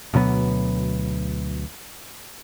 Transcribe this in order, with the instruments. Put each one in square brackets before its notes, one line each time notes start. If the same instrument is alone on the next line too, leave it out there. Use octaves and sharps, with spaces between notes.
[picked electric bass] D2 B2 F#3 B3